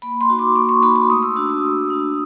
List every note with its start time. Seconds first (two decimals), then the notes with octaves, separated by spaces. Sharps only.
0.02 A#3 B5
0.21 C6
0.30 D#4 F#4
0.39 D6
0.56 A#3 C#6
0.69 C#6
0.83 D#4 F#4 B5
0.96 B5
1.10 A3 D#6
1.23 E6
1.36 D4 F#4
1.50 D#6
1.64 A3
1.90 D4 F#4